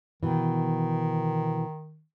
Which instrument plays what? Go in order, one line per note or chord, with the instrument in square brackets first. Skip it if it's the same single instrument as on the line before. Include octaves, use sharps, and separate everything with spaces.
[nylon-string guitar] B2 E3 [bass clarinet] D#3